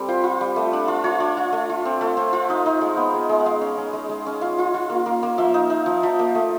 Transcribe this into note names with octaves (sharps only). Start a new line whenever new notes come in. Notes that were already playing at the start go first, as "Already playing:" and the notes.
Already playing: G3 C4 A4
F4 C5
F4
G3
A3
D4
F4
F4 C#5
D4
F4
A3
F4
C4
A3
C4
F4
D#4 D#5
D#4
G#3
B3
G#3
G#3
F#5
G#3 F5
C#4
C#4
G#3
G#3
C#4
F4 F5
F4
F4
A#3
A#3
A#3
F3 E5
D#4
D#4
F3
F3
A#3
A3